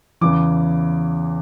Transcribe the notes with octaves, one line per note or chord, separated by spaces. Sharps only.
E2 C#3 E3 D6